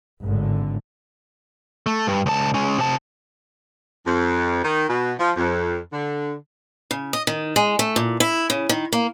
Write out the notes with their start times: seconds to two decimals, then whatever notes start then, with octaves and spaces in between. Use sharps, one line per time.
0.22 G#1 A2 D3
1.86 A3
2.07 G2
2.26 C#2 A5
2.54 G#3 C#4
2.78 C3 A5
4.06 F2
4.63 D#3
4.88 B2
5.19 F3
5.36 F2
5.93 D3
6.91 C#3
7.13 D#5
7.27 D#3
7.56 G#3
7.79 A3
7.96 A#2
8.20 E4
8.50 C#3
8.69 D#3
8.93 A#3